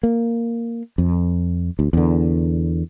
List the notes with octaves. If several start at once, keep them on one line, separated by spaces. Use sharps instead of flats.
A#3
F2
D2
E2 D3